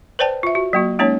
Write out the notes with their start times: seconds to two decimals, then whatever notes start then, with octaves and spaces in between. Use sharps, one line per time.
0.19 B4 C5 D5 G5 A5
0.43 F4 E5
0.55 F#4
0.73 F#3 A#3 F#4
0.99 G#3 A#3 C#4 D#4 C#5